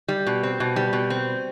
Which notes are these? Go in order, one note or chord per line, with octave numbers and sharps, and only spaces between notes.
G3
B2
C4
B2
G3
B2
C4